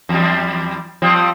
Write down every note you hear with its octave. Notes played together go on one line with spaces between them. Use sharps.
E2 G3
F3 G3 C4